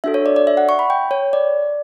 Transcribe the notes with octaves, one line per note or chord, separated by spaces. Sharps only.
D4 F#4 A4 E5
C#5
D5
D5
E5
F#5
C#6
B5
G5
C#5
D5